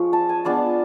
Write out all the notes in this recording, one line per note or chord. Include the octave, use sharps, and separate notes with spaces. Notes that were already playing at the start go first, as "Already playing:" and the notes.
Already playing: F3 G#3 C#4
A5
G#5
G#3 B3 D4 F4 A5